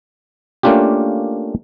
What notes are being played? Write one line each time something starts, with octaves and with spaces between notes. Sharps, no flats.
A3 A#3 C#4 D4 F4 G4